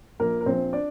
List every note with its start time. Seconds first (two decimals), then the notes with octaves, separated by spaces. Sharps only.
0.20 A#1 A#3 A#4
0.41 A#4
0.46 A#1 C4 C5
0.73 D4 D5